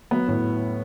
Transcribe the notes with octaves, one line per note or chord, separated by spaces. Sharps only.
F#3 B3
A2